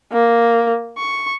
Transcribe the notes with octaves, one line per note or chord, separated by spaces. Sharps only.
A#3
C#6